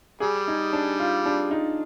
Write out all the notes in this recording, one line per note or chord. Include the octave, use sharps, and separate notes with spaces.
G3 G#4
D#4
D4
F4
D4
D#4